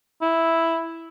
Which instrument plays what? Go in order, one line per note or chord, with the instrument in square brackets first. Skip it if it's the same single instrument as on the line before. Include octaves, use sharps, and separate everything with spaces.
[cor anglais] E4